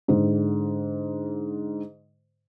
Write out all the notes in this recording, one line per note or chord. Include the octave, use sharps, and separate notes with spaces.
G#2 D3